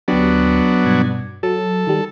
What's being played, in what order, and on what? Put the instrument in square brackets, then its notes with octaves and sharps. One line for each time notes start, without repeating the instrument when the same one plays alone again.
[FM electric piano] D2 G4 [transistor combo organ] F#3 B3 D4
[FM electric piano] G2 B2 G#6
[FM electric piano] F#3 [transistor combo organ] A4
[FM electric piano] D#3 G3